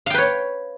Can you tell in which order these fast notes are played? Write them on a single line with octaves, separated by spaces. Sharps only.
F5 G5 B4 C#5